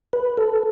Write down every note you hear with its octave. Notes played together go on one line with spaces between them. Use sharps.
B4
A4